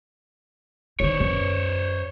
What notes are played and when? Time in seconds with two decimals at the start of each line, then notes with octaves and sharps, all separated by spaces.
1.00 D#3 E3 C5 C#5
1.20 F#2